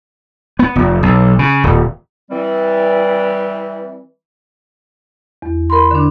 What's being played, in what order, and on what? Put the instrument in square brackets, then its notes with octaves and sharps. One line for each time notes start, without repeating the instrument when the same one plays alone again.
[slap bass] B3
F1
B1
C#3
D#1
[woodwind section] E3 G3 C4
[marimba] E2
A#4 B5 C6
D3 D4